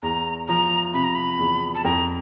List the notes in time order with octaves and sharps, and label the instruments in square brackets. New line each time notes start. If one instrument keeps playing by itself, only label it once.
[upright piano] E2 [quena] A#5
[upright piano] F3 [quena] A#5
[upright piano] C3 [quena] B5
[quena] A#5
B5
[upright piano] E2
[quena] A5
[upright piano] F2 [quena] A#5